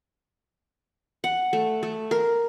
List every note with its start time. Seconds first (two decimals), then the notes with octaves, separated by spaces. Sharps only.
1.24 F#5
1.53 A3
1.83 A3
2.11 A#4